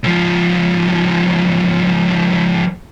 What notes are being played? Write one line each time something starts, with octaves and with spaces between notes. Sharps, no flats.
C#2 F3